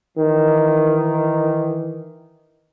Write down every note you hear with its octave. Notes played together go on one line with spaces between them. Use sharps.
D#3 E3